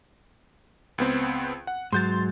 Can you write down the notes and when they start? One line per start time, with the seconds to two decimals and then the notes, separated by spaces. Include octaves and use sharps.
0.98 C#2 B3 C4
1.67 F#5
1.92 G#2 F#3 C6 G6 A6